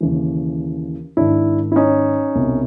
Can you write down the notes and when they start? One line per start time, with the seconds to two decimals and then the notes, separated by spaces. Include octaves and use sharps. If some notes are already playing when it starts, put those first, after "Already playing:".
0.01 D#2 C#3 E3
1.17 G#2 D#3 D4 E4
1.72 E4
1.76 C#4 D#4
2.35 C2 B2